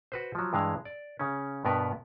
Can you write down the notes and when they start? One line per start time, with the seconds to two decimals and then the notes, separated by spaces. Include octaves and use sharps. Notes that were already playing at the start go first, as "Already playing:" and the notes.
0.12 F#4 B4 C5
0.35 F3 F#3
0.53 G2 E3 G#3 F5
0.85 D5
1.19 C#3 C#4
1.65 G2 B2 B3 A#4 B4